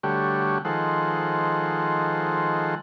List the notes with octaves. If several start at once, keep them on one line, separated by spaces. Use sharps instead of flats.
D3 G3 A3 F#4 G4 C#5
D#3 F3 G#3 A4 C5 F#5